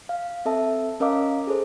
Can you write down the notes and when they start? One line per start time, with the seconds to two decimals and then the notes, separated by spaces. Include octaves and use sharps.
0.09 F5
0.45 C4 A4 E5 A5
1.00 C#4 A#4 D#5 F5 D6
1.47 G#4 A4 C5